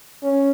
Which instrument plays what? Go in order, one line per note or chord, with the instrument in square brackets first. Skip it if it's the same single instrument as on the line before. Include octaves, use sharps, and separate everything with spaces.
[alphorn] C#4